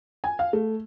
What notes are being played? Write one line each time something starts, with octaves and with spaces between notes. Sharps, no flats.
G#5
F5
A3